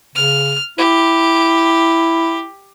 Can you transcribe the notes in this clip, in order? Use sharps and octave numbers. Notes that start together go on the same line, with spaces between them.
C#3 F6
E4 G4